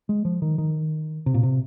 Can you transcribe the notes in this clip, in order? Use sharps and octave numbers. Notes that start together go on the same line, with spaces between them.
G#3
F3
D#3
D#3
C3
A#2
C3